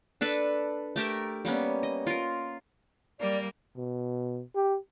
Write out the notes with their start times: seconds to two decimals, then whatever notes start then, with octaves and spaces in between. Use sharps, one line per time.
0.21 D4 A4 B4
0.96 A3 G4 A#4 E5
1.45 G3 A#3 B3 C#4
1.83 D#5
2.07 F4 A#4
3.20 G3 A#3 D5
3.77 B2
4.55 G4